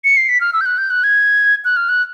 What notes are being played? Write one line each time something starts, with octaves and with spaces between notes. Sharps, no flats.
C#7
C7
B6
F6
E6
G6
F#6
G6
F#6
G#6
F#6
F6
F#6